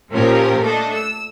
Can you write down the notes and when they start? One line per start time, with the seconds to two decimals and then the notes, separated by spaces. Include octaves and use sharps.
0.11 A#2 F3 C#4 F4 G4 A#4
0.62 A3 D4 A4 D#5
0.94 E6